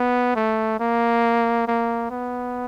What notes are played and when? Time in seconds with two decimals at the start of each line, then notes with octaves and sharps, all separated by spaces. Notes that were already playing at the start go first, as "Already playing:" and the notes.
Already playing: B3
0.36 A3
0.80 A#3
1.68 A#3
2.11 B3